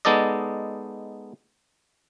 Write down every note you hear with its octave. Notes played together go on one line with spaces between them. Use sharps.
G#3 B3 D#4 A4 D5 D#5